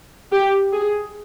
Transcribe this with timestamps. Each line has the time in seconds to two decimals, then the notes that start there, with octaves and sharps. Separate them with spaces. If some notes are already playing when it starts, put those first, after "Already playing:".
0.32 G4
0.72 G#4